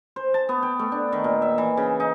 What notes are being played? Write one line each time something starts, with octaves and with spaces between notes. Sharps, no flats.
C5
A5
B3
G5
A3
D4
D#3
A#2
E5
E3
C#3
D#4